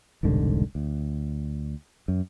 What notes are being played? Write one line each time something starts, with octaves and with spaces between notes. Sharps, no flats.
E1 C2 G#2 D3
D2
F#2